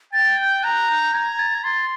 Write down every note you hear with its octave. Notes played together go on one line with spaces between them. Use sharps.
G5 A6
G6
A#5 F#6
G6
A#5 G#6
A6
G#6
C6 A6